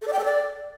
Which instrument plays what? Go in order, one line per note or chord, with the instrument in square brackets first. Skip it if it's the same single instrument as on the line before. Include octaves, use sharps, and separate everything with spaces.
[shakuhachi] A4
D5
G5
A4
D5